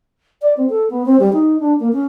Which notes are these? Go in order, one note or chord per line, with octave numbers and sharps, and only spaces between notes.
D5
C4
A4
B3
C4
G3
D#4
D4
A#3
C#4